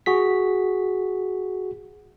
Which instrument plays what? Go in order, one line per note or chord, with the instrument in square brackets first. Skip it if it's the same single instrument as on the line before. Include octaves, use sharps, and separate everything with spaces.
[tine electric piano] F#4 G#4 B6